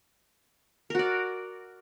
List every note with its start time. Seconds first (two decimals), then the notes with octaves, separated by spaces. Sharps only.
0.90 A#4
0.95 F#4
0.99 D5